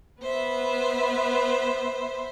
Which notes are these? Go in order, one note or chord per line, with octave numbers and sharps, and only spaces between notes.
B3 B4 C5 E5